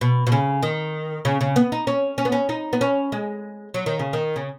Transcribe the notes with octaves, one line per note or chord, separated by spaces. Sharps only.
B2
B2
C#3
D#3
C#3
C#3
B3
D#4
C#4
C#4
B3
C#4
D#4
B3
C#4
G#3
F#3
D#3
C#3
D#3
C#3